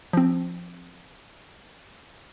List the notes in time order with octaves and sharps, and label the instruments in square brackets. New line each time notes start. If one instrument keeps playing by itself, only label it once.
[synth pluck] F3 C4